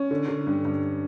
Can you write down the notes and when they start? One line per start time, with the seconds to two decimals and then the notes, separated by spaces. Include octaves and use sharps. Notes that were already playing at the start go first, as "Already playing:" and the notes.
Already playing: C#4
0.11 D3
0.28 D3
0.47 G2
0.65 G2